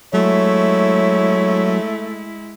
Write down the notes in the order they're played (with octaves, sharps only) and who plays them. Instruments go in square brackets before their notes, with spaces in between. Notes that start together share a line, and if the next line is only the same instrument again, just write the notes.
[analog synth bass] F#3 [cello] G#3 E4 [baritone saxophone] A3 [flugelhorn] C#5